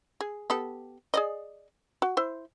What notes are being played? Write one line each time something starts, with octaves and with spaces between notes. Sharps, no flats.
G#4
B3 G4 A4
G#4 D5 D#5
F#4
E4 C5